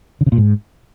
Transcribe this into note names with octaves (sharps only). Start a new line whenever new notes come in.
D3
C#3
A#2
G#2